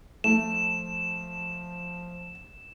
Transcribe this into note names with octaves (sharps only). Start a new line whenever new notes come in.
F3 A3 E7